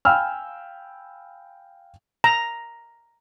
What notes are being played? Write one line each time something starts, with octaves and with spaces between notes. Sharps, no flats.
F5 G5 G#5 B5 E6 F6
A#5